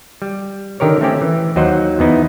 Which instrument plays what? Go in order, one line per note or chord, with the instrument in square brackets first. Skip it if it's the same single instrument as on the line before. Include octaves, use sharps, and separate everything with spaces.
[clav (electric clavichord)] G3
D3 D#3 G4 A#4 C#5
A3 C4 C#4 G4
E3
D#2 F#3 D#4 C5 F#5
E2 B3 D#4 E4